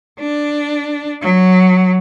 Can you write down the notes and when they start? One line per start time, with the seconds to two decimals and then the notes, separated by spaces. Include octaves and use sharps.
0.20 D4
1.22 F#3